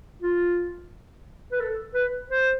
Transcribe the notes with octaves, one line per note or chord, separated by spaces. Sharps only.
F4
B4
A4
B4
C5